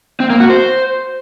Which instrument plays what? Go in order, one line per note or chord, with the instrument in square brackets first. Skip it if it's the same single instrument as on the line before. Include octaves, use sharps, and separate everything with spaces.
[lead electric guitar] C4
A#3
F#4
C5